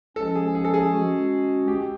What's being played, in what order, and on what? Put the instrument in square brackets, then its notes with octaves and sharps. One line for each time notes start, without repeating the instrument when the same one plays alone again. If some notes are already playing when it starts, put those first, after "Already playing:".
[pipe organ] F3 G#3 C#4 [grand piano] A4
[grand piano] G#4
G#4
A4
G#4
[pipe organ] G#3 C#4 F#4
[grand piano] G4